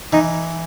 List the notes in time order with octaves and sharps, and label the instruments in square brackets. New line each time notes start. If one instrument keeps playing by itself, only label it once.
[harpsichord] E3 [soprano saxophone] D#4